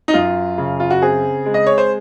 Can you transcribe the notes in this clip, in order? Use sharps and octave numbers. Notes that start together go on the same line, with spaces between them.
D#4
F#2 F4
C#3
F4
F#4
C4 G#4
G#3
D#5
C#5
C5